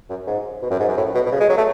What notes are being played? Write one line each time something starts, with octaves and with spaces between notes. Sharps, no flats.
F#2
G#2
B2
F#2
G#2
F#2
A2
B2
B2
C#3
G#3
F#3
A3